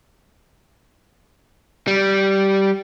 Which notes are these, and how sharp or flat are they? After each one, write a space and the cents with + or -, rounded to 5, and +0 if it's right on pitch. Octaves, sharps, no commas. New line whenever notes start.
G3 -10